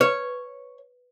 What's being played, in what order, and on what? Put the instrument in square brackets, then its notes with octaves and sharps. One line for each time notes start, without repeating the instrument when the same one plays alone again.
[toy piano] B4 [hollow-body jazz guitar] C#5